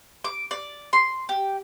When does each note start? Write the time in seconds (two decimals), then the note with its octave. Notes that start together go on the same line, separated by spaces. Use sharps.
0.24 D6
0.51 D5
0.93 C6
1.29 G4